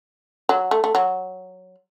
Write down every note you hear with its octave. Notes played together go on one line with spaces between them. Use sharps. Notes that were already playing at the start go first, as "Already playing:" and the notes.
F#3
A3
A3
F#3